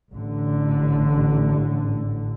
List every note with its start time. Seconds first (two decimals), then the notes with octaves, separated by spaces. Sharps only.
0.13 A1 D3